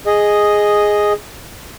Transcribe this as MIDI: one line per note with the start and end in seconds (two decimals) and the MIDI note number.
0.06 1.13 68
0.06 1.13 75